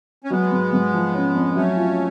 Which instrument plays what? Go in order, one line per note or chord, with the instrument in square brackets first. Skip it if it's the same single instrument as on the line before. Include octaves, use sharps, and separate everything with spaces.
[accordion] C#4
[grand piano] F#3 [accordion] G#3 B3
[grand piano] G#2
G#2
F3
C#4
F2
[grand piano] F#3 [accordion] A3 C#4
[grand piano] F4